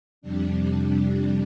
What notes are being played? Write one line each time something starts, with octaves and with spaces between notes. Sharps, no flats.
F2 C3 G3 D4